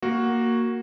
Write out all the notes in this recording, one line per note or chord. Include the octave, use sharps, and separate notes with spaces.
A#3 F#4